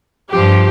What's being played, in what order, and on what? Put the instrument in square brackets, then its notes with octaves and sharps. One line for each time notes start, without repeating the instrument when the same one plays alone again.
[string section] G2 F3 G4